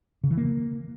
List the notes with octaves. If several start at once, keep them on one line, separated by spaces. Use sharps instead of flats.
C#3
E3
A#3